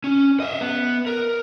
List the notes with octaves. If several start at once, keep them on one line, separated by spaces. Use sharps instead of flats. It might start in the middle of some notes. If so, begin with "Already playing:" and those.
C#4
D#5 E5
B3
A#4